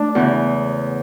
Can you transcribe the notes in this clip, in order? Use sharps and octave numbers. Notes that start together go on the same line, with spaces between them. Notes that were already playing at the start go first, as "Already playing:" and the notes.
Already playing: A3 D4
E2 C#3 E3